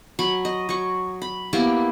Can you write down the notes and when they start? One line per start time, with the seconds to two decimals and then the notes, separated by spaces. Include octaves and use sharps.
0.19 F#3 B5 C#6
0.45 D#5
0.69 F#3 C#6
1.22 B5
1.53 A#3 B3 E4 G4